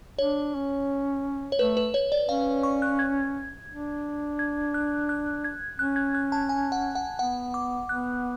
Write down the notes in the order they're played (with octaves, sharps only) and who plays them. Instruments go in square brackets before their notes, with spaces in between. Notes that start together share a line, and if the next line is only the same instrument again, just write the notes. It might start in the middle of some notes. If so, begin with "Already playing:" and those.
[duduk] D4 [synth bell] C#5
[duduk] C#4
[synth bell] C#5
[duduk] A3 [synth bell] B4
[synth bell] B4
C#5
D5
[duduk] C#4 [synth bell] F5
[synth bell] C#6
F#6
G#6
[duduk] D4
[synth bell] G#6
F#6
F#6
G#6
[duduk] C#4 [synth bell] F#6
[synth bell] G#6
F#6
A5
G#5
F#5
F#5
[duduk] B3 [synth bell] F#5
[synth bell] D6
[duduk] B3 [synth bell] F#6